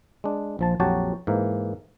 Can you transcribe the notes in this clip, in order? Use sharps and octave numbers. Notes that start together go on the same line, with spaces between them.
G#3 D4
A#1 F3 A5
A#1 F2 F#3 F#4 G4 A5
G#2 E3 A#3